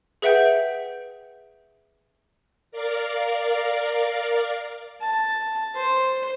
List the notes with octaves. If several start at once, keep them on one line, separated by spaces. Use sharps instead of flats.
G#4 B4 E5 F#5 G5 G6
A#4 D5 F5
A5
C5